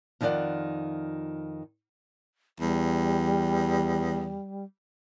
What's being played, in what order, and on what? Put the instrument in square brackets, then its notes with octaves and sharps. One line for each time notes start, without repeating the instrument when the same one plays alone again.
[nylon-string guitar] F2 D#3 C#4 F4 D5 F#5
[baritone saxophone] E2 [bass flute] G3